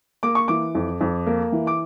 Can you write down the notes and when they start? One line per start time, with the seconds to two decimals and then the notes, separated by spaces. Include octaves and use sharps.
0.23 A#3 D6
0.35 C#6
0.48 E3 D6
0.75 F2
1.01 F2
1.27 A#3
1.52 E3
1.67 D6